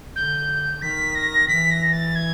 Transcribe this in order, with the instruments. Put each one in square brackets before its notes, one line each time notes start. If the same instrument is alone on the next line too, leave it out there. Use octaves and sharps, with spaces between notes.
[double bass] D3 [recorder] G6
[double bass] D#3 [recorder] B6
[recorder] A#6
[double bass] E3 [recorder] B6
[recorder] A#6
A6
G#6